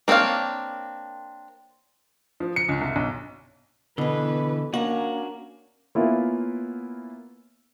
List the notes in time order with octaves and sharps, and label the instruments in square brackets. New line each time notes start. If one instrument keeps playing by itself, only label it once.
[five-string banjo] A#3 C4 D4 C#5 F5
[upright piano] F3
C#7
C#2
C2
B1
[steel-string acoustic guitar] B2 E3 [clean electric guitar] D3 [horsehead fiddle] E4 B4
[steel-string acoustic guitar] A#3 A#5 [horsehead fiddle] C#4 D4 [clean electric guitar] F#4
[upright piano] A#3 B3 C#4 E4 F4